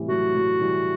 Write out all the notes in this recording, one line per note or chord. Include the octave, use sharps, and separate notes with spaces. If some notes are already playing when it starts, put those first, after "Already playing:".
Already playing: A2 C3 E3 G3
F#3 A3 F#4
F#3 A3
E3 G3